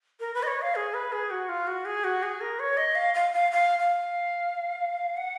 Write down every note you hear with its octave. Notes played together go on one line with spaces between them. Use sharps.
A#4
B4
D#5
C#5
F5
G#4
B4
G#4
F#4
F4
F#4
G#4
F#4
G#4
A#4
C#5
D#5
F5
F5
F5
F5
F5
F#5